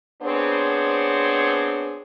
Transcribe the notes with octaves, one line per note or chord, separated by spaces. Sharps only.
B3 C4 D4 G#4 C5 C#5